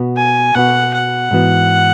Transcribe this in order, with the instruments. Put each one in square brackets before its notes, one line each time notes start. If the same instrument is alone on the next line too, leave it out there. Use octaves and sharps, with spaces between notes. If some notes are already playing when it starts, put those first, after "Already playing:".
Already playing: [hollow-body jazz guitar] B2 B3 F#4
[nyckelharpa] G#5
[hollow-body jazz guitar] B2 B3 F#4 [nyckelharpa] F#5
[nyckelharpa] F#5
[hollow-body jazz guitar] G#2 E3 B3 F#4